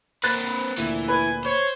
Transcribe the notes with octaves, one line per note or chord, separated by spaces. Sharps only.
A#3 C4 B4 F#6 A6
D2 A#2 E3 C4
B4 G#5
C5 C#5